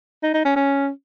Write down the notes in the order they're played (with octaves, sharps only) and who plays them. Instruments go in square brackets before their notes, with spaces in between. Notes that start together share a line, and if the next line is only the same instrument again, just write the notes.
[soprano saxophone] D#4
D#4
C#4
C#4